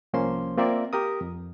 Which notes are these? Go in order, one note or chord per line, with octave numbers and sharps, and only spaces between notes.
C2 F3 A#3 C#4 C5 C6
A#3 C4 F4 A#4 D5 E5
G4 A#4 D#6
F2